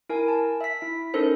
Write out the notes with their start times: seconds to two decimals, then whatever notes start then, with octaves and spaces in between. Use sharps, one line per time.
0.09 E4 A#4 G#5
0.28 A5
0.61 E5 B6
0.82 E4
1.14 C#4 D#4 A4 A#4 C5